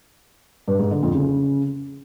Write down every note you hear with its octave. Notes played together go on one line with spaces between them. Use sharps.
G2
G#2
D3
F2
C#3